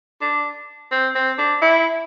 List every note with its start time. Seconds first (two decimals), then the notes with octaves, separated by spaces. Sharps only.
0.22 D4
0.92 C4
1.15 C4
1.38 D4
1.62 E4